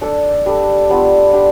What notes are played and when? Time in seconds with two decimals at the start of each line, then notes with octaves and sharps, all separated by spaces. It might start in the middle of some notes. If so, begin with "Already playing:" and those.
0.01 D4 A4 D5
0.46 G3 D4 A4
0.90 G3 B3 D4 F4
1.33 D4 G4